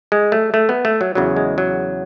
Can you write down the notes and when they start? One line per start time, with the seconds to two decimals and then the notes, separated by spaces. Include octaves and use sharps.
0.12 G#3
0.32 A3
0.54 A3
0.69 B3
0.85 A3
1.01 F#3
1.15 E2 C#3 F#3
1.36 G#3
1.58 F#3